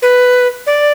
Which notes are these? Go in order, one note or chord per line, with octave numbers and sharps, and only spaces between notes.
B4
D5